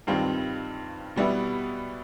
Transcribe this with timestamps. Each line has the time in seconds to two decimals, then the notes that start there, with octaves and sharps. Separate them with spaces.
0.07 G2 D#3 G3 C4 F4
1.16 B2 G3 B3 E4